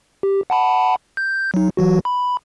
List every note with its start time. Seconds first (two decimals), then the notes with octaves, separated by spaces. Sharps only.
0.23 G4
0.50 F#5 A5 B5
1.17 G6
1.54 F#3 D#4
1.77 E3 F#3 F#4
2.05 B5